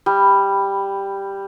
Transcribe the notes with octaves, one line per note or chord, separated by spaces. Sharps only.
G3